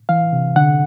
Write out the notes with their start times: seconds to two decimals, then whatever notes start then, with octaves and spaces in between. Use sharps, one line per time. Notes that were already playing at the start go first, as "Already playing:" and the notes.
0.09 E3 F5
0.33 C3
0.56 D3 F#5